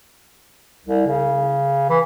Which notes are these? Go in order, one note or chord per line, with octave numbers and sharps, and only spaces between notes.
C2
C#3
E3